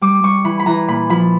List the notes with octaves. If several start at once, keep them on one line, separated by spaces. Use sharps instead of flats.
G3 D6
G3 C#6
E3 B5
B5
E3 A#5
A#2 B5
F3 B5